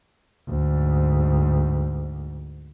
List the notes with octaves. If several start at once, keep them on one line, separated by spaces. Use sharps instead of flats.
D2 G#2